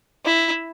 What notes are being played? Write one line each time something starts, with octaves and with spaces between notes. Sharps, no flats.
E4